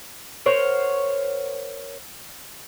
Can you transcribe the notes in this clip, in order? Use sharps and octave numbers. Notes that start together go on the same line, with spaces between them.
A#4 C5 C#5 F#5